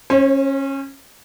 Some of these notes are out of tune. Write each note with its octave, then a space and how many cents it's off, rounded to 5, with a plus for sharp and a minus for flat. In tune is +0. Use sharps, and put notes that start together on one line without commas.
C#4 -20 C5 +40